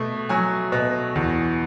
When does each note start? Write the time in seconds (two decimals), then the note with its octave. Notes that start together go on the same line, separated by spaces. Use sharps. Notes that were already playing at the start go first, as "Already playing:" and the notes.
Already playing: B2 A3
0.29 F#3 G#5
0.72 B2
1.15 E2